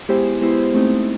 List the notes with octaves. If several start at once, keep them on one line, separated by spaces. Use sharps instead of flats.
G#3 B3 E4 G4 C5
G#3 B3 E4 G4 C5
A3 C4 D#4